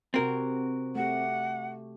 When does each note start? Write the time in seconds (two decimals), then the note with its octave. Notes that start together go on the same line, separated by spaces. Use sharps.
0.14 C3 C4 F#4 G4 A#4
0.95 A3 G4 F#5